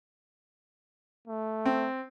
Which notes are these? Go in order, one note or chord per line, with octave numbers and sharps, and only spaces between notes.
A3
C4